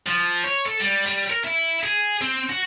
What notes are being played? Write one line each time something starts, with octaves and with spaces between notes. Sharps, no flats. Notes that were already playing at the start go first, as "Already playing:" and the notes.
F3
C#5
A4
G3
G3
A#4
E4
G#4
C4
F#4